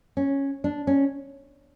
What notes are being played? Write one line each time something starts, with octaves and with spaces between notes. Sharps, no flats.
C#4
D4
C#4